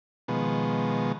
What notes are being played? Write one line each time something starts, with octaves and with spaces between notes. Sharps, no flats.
B2 D#3 F3 G#3 B3